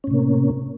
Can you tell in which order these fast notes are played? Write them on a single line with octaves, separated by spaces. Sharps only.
C#4 A2 C3 A#3